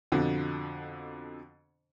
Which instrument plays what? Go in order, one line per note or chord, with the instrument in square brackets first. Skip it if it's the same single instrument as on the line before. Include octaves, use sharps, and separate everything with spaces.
[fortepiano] F2 B2 D3